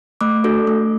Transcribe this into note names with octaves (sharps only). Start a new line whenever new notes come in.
A3 D6
D4 F#4 A4
A3